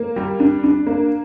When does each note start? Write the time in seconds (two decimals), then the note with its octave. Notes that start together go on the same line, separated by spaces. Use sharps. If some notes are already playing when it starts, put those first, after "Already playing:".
Already playing: A#3
0.16 G3
0.40 D4
0.64 D4
0.87 A#3